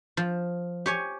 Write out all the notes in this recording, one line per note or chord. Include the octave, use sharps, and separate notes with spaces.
F3
G4 C#5 G#5